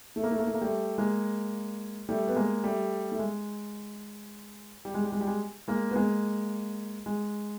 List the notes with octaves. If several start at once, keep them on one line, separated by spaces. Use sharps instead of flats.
A3
A#3
A3
A#3
A3
A#3
G3 A3
G#3 A#3
G3 A3
B3
G#3 A#3
G3 A3
A3
G#3
G3
G#3
G3
G#3
G3
G#3
G#3 A#3
B3
G#3 A#3
G#3